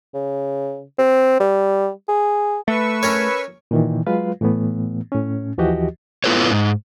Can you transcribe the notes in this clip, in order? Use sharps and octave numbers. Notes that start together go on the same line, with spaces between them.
C#3
C4
G3
G#4
A3 B4 C#6 E6
C#4 A#4 C#5
A#2 D#3 E3
F#3 G#3 F4 B4 F5
A2 E3 A3 B3
A2 C#4
D#2 E3 F3 F#4 G4 D#5
B3 E4 F4 A4 B4 C#5
G#2